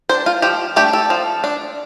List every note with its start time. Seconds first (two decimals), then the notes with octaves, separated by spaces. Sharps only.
0.09 D4 C5
0.26 F4
0.42 F3 G4
0.76 A3 D4 G4
0.93 A4
1.10 F3
1.44 D4